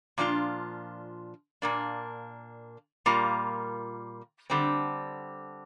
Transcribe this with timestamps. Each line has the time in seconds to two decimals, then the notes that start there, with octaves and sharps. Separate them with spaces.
0.18 A#2 F3 D4 F4
1.62 A#2 A#3 D4
3.06 A#2 G3 A#3 F4
4.50 D3 G3 C4